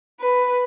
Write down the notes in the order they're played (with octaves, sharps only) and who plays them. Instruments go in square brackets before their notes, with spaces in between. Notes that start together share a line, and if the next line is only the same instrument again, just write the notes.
[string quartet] B4